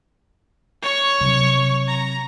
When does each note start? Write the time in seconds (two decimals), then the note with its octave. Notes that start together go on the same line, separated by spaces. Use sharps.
0.82 C#5 C#6
1.21 C3 F#3
1.87 A#5